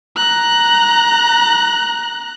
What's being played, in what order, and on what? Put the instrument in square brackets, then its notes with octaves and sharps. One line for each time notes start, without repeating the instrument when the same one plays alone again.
[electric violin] A#5 F#6